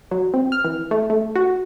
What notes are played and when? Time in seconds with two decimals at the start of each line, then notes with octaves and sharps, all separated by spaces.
0.11 F#3
0.34 C4
0.52 F6
0.65 E3
0.91 A3
1.10 A3
1.36 F#4